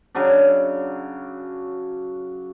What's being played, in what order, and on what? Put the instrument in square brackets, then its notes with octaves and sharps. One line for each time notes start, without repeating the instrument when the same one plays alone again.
[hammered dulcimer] C#3 F#3 D4